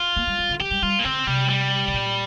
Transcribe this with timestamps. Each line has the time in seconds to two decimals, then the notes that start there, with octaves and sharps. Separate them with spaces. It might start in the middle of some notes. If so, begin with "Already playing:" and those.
Already playing: F4
0.16 A#3
0.27 G3
0.39 G3
0.50 D3
0.60 F3 G4
0.71 G3
0.82 G3 F4
0.99 A#3
1.04 D3 C4
1.27 C3 G3
1.49 G3
1.88 C3
1.94 A#2